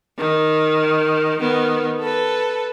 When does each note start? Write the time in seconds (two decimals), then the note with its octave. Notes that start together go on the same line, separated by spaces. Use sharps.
0.18 D#3
1.39 D#3 B3
1.99 A4 B4